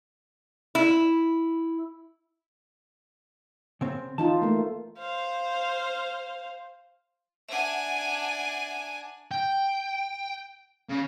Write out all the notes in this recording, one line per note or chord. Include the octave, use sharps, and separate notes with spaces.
E4
C#3 C4
E3 D#4 F4 A5
A3 A#3
C5 F5
D4 E5 F#5 G#5
G5
C#3